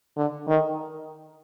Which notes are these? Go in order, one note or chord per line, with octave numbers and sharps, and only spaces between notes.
D3
D#3